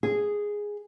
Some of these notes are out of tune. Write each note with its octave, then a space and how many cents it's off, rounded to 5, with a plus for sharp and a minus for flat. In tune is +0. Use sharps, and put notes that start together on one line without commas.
G#4 -5